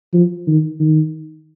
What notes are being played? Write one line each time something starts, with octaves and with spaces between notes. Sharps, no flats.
F3
D#3
D#3